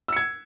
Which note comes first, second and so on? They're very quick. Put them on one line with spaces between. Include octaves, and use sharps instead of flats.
E6 C#7 G#6